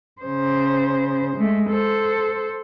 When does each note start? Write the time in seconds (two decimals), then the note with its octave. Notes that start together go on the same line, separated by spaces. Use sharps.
0.22 C#3 C5
1.37 G#3 A3
1.70 A4 C5